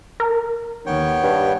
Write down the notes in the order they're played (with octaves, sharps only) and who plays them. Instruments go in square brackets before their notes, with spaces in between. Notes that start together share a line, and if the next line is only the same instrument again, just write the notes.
[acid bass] A#4
[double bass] D#2 D#3 [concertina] B3 C#5 G5
[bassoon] G2